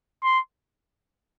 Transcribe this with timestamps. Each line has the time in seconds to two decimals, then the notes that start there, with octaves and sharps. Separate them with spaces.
0.23 C6